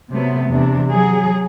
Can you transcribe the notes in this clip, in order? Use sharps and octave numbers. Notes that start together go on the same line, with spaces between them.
C3 F#3 A3 B3
E2 C3 D4
F#3 G#4